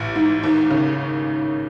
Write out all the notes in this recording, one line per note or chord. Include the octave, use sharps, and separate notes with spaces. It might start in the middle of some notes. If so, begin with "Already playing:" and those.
Already playing: A1
G#2
D#2
C#3